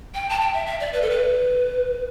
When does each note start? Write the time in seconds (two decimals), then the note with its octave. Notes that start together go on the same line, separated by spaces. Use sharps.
0.14 G5
0.30 A5
0.41 G5
0.53 E5
0.67 E5
0.80 D5
0.93 B4
1.02 A4
1.10 B4